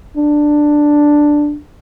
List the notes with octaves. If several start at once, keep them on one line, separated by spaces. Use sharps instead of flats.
D4